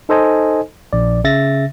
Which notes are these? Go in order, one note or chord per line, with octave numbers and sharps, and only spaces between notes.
D#4 A4 C5 D#5 G#5
A#1 D5
C#3 E5 A6 A#6